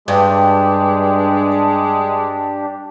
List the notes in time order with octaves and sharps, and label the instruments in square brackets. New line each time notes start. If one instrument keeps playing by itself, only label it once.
[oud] G2 [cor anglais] G#3 [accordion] D4 G4 [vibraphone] B4 G5
[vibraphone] A5